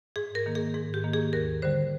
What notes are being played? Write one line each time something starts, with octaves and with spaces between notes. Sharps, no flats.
G#2 G#4
A#4
D#3 A#3
G#4
G#2 G#4
G4
D#3 A#3
G#4
D#2 A#4
D3 G3 C5